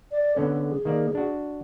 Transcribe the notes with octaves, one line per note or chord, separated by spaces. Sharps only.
D5
D3 B3 C#4 A4
G#4
D#3 A#3 D5
D4 F#4